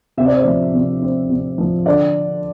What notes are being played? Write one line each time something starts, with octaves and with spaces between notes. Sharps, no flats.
C3 E5
D5
C5
F3 D5
C3
C4
C3
F3
D3 D5